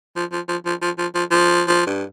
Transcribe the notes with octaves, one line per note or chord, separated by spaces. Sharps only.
F3
F3
F3
F3
F3
F3
F3
F3
F3
G2